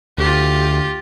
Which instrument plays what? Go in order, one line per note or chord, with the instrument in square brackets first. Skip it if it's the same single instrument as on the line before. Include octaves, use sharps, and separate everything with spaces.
[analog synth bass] D2 [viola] F4 G4